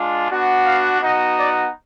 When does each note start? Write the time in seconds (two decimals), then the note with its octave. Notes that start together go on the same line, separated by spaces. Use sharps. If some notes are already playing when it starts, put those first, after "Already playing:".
Already playing: G#3 D4 F4
0.29 B3 D4 F#4
0.65 F5
1.00 B3 D#4 F#4 D#5
1.37 D5